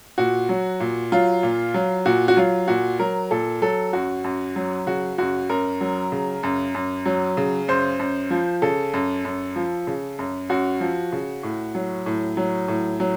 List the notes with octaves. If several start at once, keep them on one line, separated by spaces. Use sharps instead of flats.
A#2 F#4
F#3
A#2
F#3 F4
A#2
F#3
A#2 F#4
F#4
F#3 F4
A#2 F#4
F#3 A#4
A#2 A4
F#3 A4
F#2 F#4
F#2
F#3
C#3 F#4
F#2 F#4
F#2 A#4
F#3
C#3
F#2
F#2
F#3
C#3
F#2 C5
F#2
F3
C#3 A4
F#2
F#2
F3
C#3
F#2
F#2 F#4
F3
C#3
A2
F#3
A2
F#3
A2
F#3